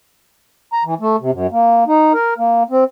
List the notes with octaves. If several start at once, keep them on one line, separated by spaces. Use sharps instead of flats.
A#5
E3
A3
C3
F#2
A#3
D#4
A#4
A#3
C4